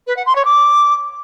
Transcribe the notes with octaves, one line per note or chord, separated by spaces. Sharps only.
B4
F#5
C6
C#5
D6